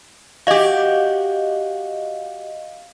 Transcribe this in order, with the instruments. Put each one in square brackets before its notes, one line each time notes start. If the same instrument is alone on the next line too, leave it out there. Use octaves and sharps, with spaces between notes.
[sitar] F#4 G4 [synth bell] D#5 F5